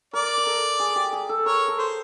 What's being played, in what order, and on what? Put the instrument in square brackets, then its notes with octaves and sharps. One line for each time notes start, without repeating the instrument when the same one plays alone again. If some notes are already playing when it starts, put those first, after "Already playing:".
[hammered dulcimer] A#4 [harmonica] D5
[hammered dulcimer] A#4
A4
G#4
G4
G#4
A4
[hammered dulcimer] A#4 [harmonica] C#5
[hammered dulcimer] A4
[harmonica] C5